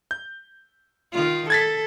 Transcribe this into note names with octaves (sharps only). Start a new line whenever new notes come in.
G6
D#3 F4
A4 G#6 A6 B6